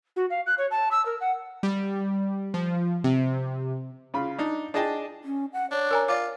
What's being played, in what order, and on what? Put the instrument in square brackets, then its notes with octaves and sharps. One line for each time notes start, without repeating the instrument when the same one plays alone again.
[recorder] F#4
F5
F#6
C#5
A5
E6
A#4
F#5
[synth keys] G3
F3
C3
[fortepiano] C#3 F4 B5
D4 D#4
D4 G#4 D#5 G5 A5
[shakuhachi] C#4
F#5
[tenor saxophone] D4 [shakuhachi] C#5
[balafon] A#4 G#5 A#5
[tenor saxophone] F4 [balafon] D5 D6